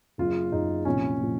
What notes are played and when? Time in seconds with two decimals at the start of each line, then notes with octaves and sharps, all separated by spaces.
0.18 F#1 F#2 C#3 F4
0.52 F#1 F#2 C#3 D#4
0.85 C2 A#2 F3 C#4
1.21 A#2 F3